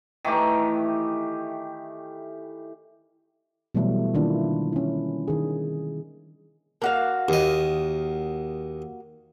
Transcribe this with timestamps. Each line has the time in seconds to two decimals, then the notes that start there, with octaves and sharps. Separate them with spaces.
0.25 D#3 E3 A3 G4
3.75 B2 E3 F#3 G3 A3
4.14 D3 D#3 A#3 D4 E4 F4
4.73 C#4 E4
5.28 D#3 G#4
6.82 A#3 F#4 F5
7.29 D#2 D#5